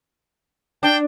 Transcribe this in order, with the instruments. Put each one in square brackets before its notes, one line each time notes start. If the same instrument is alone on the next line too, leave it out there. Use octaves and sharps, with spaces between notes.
[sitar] D4 [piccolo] G5